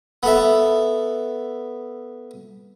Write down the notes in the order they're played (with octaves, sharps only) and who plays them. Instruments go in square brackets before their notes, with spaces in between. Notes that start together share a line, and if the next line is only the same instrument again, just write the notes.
[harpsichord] B3 A4 E5